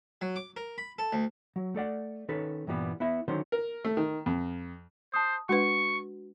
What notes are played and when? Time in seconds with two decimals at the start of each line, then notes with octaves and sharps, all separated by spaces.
0.21 F#3
0.36 D6
0.57 A#4
0.78 B5
0.99 A4
1.13 D2
1.56 F#3
1.74 A3 A4 D5 F#5
2.29 D#3 C#4 A4 B4
2.67 G2 A#2 E3 G3 B3
3.00 B3 E4 E5
3.28 D3 D#3 F#3 C#4 C5
3.52 A#4
3.85 A3
3.97 D#3
4.26 F2
5.14 C5 A5 D#6
5.49 G#3 D4 F#4 B4 C#6